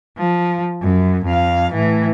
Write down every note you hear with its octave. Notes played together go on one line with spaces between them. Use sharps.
F3
F#2
F2 F5
A2 E3